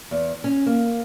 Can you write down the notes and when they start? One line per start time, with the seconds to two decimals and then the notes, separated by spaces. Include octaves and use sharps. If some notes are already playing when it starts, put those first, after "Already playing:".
0.11 E2
0.44 C#4
0.66 A#3